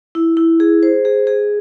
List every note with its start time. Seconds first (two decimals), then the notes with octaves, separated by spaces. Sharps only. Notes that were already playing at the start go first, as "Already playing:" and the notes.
0.15 E4
0.37 E4
0.60 G#4
0.83 C5
1.05 G#4
1.27 G#4